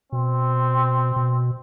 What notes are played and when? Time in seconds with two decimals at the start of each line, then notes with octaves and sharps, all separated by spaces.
0.12 B2 C4
1.16 B2